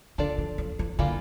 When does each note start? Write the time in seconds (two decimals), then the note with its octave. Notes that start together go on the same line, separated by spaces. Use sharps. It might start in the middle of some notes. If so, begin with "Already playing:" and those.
0.18 D3 D4 F4 A4 D5
0.38 E3
0.58 F3
0.79 E3
0.99 D3 E3 G3 A#3 F4